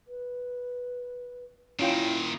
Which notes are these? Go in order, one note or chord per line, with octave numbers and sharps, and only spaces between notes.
B4
A#2 D#3 C#4 E4 F4 G5